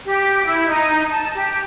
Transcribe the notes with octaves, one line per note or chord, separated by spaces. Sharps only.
G4
E4
D#4
A5
G4